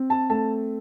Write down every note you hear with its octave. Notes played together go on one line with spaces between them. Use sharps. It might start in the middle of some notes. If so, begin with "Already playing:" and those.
Already playing: C4
A5
A3 A5